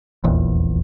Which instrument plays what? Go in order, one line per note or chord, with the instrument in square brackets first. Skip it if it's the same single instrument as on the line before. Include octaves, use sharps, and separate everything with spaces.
[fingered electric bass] D#1 A#1 E2